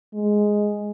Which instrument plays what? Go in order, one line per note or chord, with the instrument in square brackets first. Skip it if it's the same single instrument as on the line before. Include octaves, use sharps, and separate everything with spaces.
[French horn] G#3